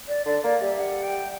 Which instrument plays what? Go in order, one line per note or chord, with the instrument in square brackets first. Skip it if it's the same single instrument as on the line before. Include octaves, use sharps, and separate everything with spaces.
[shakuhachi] D5
[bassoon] D3 [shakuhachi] D5
[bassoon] A#3 [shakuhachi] D5
[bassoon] G3 [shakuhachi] E5
[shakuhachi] F#5
G5